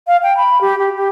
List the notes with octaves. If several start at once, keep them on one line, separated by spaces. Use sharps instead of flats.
F5
G5
B5
G4
G4
G4